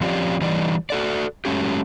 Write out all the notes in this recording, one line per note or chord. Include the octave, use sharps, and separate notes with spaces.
F3 C4 C#4 F4 G4 D5
E3 G3 D#4 D5
F#4 A4 D5
F#3 G#3 A3 C#4 G4